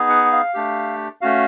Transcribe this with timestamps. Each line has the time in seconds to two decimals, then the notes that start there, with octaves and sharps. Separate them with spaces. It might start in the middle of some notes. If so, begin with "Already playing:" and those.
Already playing: B3 D#4 G#4
0.10 F#5
0.32 F5
0.54 A3 D4 G4
1.21 A3 C#4 F#4 F5